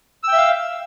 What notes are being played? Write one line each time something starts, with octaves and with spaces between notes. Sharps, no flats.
E5 F5 G5 E6